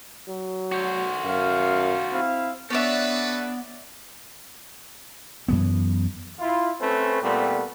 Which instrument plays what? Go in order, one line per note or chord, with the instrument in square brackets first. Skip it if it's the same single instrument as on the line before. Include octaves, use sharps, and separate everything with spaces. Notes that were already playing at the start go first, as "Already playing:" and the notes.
[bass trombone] F#3
[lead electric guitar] F#4 C5
[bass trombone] F#2 [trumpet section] F5
[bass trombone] C4 [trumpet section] E4 F5
[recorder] B3 [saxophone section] D4 [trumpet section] F#4 A4 B4 [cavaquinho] C#5 D5 E5
[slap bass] F#2 E3 B3
[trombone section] E4 F4
A3 C4 C#4 B4
A#2 G3 A3 B3 C4